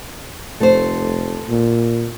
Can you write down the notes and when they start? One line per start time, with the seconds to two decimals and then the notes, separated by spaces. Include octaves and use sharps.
0.60 F1 A3 C5
1.49 A#2